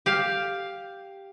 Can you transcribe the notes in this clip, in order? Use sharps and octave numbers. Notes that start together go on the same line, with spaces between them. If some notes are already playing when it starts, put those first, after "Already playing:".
G4 F5